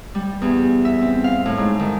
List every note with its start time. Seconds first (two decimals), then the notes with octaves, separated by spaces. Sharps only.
0.15 G3
0.42 E2
0.85 E5
1.01 C4
1.24 F5
1.46 A2
1.57 G#2
1.79 D#3